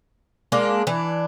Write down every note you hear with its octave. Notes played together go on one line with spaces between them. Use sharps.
G#3 A#3 D4
E3 D4